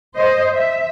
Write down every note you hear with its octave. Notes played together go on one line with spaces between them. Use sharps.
C5 D#5
E5